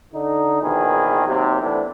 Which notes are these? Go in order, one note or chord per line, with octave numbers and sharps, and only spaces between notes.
D3 D#4
A#1 B2 D#3 E3 G#4 B4
D#2 C3 F#3
E3 A3 B3 C4 D4 E4